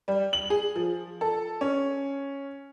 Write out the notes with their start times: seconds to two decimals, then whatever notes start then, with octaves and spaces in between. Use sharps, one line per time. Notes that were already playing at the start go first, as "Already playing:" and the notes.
0.08 G3
0.33 F#7
0.50 G#4
0.75 F3
1.21 A4
1.61 C#4